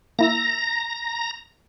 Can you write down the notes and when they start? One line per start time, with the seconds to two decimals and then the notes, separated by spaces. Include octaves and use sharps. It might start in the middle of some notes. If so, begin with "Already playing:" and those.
0.19 A#3 E4 A#5 E6 A#6